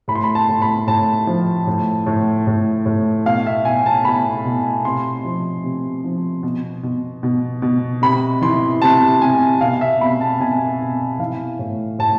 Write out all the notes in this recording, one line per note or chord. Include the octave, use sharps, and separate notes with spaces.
A2 B5
C6
B5
A5
A2
B5
A2 A5
F3
A2
A2
A2
A2
B2 F5
E5
B2 G#5
A5
B2 B5
B2
C3 C6
F3
C3
F3
B2
B2
B2
B2
C3 B5
E3 C6
C3 A5
C3 G#5
B2 F5
E5
B2 B5
A5
B2 G#5
B2
E3 F5
A2
A2 A5